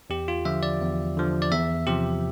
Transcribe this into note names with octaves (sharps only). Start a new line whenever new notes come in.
E2 G4
F4
D3 F3 E5
D5
E2
D3 F3
D5
E2 E5
C3 F3 G4